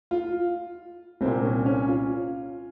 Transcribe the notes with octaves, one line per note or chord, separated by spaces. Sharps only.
F4
C2 A#2 C4
C#4
C#4
F4